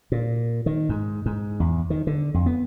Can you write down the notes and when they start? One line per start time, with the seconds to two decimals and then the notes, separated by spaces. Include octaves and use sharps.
0.12 A#2
0.66 D#3
0.89 G#2
1.26 G#2
1.60 E2
1.90 D#3
2.07 D3
2.34 F2
2.46 B3